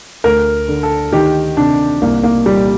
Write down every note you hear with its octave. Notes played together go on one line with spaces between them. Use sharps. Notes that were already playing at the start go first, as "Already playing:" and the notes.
D2 A#4
D3
A4
D#3 G4
C3 D4
C2 A#3
A#3
A#2 G3